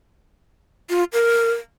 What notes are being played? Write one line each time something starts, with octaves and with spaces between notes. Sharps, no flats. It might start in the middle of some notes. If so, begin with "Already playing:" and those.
F4
A#4